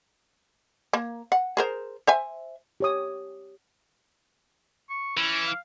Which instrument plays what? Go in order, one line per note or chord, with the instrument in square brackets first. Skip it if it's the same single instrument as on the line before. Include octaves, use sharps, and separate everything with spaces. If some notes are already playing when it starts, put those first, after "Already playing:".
[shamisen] A#3
F#5
G#4 A#4 C5
C5 E5 G#5
[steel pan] G4 C#5 D#6
[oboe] C#6
[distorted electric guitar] E3 [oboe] C#4
[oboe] F5